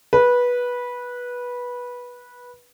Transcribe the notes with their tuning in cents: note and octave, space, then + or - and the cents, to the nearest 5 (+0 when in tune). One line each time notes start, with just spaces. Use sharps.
B4 -15